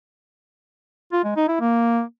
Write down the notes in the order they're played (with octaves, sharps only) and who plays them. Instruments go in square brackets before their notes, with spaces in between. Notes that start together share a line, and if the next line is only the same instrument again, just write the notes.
[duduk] F4
G#3
D#4
E4
A#3